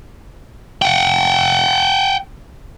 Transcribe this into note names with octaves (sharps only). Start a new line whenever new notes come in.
F#5 G5